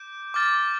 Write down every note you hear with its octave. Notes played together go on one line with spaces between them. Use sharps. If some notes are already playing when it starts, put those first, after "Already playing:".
Already playing: D6 G6 D7
D6 F6 A6